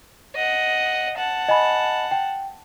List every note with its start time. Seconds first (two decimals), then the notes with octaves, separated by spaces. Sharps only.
0.36 D#5 F#5
1.17 F#5 A5
1.48 D#5 G#5 B5
2.11 G5